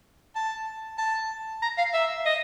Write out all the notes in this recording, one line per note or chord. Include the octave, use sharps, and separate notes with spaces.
A5
A5
A#5
F5
E5
D#5